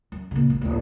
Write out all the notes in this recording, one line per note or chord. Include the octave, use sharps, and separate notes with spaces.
F#2
A#2 C#3
G#1
D1 A#1